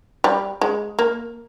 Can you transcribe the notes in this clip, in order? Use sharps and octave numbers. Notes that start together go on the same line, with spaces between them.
G3
G#3
A#3